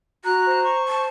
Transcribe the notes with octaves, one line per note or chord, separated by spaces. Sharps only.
F#4 A#5 F#6
C5
C#6
A5